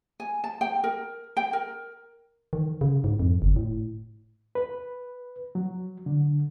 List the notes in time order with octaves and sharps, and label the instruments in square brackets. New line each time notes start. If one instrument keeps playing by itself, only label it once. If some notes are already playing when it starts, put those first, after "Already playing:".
[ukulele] G#5
A5
G5
A#4
G5
A#4
[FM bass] D#3
C#3
G#2
F2
G1
A2
[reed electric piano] B4
F#3
D3